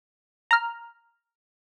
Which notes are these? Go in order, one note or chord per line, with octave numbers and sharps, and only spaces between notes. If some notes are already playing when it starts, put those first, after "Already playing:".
A#5 F6